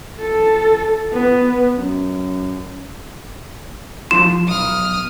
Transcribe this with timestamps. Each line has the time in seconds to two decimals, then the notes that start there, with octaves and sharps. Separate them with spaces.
0.19 A4
1.12 B3
1.77 F#2
4.11 F3 F4 C6 E7
4.48 B1 D#6 F6